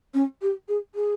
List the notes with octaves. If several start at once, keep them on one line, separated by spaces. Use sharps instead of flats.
C#4
G4
G#4
G#4